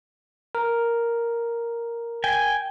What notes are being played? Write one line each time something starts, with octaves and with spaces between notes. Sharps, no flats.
A#4
G5 G#5